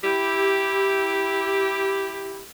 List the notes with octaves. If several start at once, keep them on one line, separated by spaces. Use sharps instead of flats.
E4 G4